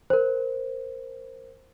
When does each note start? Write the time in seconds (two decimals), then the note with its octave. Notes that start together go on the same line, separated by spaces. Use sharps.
0.10 A#4 C5